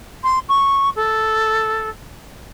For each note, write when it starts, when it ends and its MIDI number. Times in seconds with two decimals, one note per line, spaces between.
0.24 0.39 84
0.49 0.90 85
0.96 1.89 69